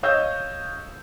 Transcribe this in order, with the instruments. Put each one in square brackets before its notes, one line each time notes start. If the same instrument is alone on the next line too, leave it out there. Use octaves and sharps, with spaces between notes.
[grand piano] C#5 D#5 F5 E6 G6